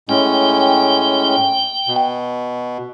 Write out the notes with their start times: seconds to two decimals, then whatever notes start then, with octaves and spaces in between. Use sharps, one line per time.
0.09 A2 G#3 C#4 G5
1.88 B2